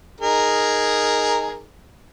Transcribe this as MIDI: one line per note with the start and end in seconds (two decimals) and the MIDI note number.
0.21 1.62 63
0.21 1.62 68
0.21 1.62 70